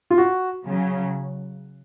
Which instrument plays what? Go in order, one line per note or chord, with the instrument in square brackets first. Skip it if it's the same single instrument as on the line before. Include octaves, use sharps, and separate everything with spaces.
[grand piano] F4
F#4
[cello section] C#3 F#3